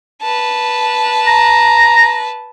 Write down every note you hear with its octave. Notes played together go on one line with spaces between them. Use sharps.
B4 A5
A#5